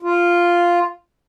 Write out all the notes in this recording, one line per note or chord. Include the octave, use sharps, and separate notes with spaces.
F4